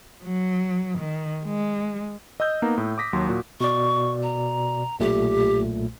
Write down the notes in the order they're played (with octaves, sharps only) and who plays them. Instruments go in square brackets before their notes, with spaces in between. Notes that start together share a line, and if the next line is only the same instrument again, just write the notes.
[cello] F#3
D#3
G#3
[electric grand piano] D#5 D#6 E6 G6
A#3 B3 D#4 A#5
A2
D6 D#6 A#6 B6
D#2 F#3 C6
A#2 F#4
[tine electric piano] B2 D5 [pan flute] C#6
[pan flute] A#5
[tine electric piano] B1 A#2 A3 [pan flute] G4